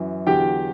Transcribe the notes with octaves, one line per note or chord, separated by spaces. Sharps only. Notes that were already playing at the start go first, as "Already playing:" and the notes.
Already playing: F#2 E3
E2 D3 F#3 G4 G5